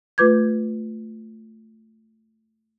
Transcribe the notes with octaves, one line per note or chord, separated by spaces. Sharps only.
A3 F4 B4 D6 G6 G#6